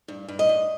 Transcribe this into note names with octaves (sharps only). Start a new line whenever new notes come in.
G2
G2
D#5
G2